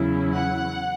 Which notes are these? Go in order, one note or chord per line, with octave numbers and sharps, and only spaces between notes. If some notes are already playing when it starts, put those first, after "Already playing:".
Already playing: E2 C#3 F#3 C#4 E4
F#5